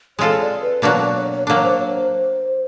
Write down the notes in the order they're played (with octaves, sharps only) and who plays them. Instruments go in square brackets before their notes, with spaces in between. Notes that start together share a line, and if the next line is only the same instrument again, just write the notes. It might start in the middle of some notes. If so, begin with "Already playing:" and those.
[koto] G#3 C4 F4 A4 [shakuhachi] C#5
[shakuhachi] D5
B4
[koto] B2 F#3 A#3 D4 F#4 [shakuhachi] D5
[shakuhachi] D5
C#5
C#5
[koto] F#3 A#3 D4 [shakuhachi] C#5
[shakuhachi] C5
C#5
C5